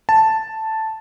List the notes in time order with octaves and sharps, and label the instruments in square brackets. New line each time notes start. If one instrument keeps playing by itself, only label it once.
[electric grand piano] A5